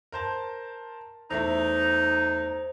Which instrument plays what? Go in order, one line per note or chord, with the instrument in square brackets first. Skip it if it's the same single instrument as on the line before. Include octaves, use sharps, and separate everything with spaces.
[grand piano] A#4 C5 A5
[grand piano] E2 A3 E4 [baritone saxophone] D#4 [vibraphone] C5